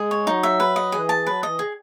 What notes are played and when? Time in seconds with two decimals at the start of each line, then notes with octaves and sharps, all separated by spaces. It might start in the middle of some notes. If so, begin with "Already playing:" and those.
Already playing: G#3 G#4
0.11 C#5
0.27 F#3 D#4
0.43 E5
0.60 B4
0.76 D#5
0.92 E3 G#4
1.09 A5
1.25 F#3 B4
1.43 E3 D#5
1.59 C#3 G#4